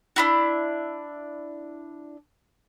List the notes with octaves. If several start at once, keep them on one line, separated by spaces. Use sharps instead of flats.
D4 E4 F#4